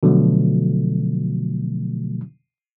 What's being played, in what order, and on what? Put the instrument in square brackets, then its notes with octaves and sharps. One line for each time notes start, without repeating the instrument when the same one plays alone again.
[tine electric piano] B2 D3 F3 F#3 A3